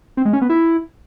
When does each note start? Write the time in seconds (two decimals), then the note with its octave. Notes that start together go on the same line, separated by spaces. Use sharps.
0.17 C4
0.25 G#3
0.33 C#4
0.41 B3
0.50 E4